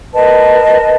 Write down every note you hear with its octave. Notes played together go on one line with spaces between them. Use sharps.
A#4 B4 D#5 A5